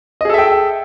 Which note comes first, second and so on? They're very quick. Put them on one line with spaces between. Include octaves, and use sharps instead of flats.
D#5 G#4 A4 E5 G5